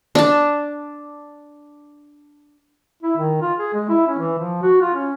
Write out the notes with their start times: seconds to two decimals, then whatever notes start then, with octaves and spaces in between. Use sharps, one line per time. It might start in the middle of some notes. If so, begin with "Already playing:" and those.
0.15 D4 A5
3.03 E4
3.17 D#3
3.41 F4
3.59 G#4
3.74 G#3
3.89 E4
4.07 C#4
4.18 E3
4.39 F3
4.62 F#4
4.81 F4
4.94 C#4